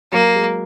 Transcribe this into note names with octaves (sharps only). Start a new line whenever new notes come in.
F#3 A#3
G#3